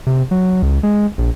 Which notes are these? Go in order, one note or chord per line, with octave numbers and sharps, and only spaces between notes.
C3
F#3
C#2
G#3
A#1